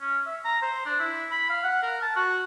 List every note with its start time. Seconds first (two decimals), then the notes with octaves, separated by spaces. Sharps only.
0.01 C#4
0.26 E5
0.45 A#5
0.63 C5
0.86 D4
1.00 E4
1.31 B5
1.50 F5
1.64 F#5
1.83 A#4
2.02 A5
2.16 F#4